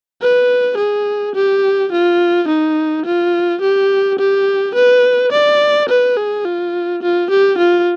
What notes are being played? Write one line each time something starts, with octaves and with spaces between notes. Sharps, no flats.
B4
G#4
G4
F4
D#4
F4
G4
G4
B4
D5
B4
G#4
F4
F4
G4
F4